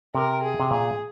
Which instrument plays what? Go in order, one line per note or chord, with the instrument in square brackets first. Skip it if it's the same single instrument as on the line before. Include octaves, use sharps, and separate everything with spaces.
[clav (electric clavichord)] C3 [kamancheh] A#4
[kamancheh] G#4
[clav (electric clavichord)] C3
[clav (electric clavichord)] A#2 [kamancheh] G#4